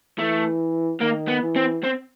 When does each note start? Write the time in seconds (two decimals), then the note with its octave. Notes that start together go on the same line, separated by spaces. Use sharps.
0.19 E3 A3
1.01 D#3 A#3
1.28 B3
1.42 E3
1.56 C4
1.84 C4